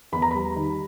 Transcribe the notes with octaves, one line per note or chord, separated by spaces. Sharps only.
E2 B5
A#5
G3 B5
D#3